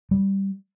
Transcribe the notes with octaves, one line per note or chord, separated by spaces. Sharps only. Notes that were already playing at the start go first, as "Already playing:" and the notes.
G3